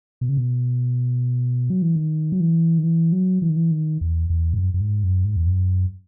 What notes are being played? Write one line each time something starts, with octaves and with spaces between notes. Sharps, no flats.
B2
C#3
B2
F#3
E3
D#3
F#3
E3
D#3
E3
F#3
E3
D#3
E3
D#3
E2
E2
G#2
F#2
F#2
G#2
F#2
G#2
E2
F#2